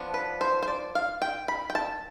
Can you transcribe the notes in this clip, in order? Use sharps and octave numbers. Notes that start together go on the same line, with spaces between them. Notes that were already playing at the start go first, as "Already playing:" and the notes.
Already playing: F3 B3 D4
B4
C5
C5
D5
F5
G5
B5
G5
A5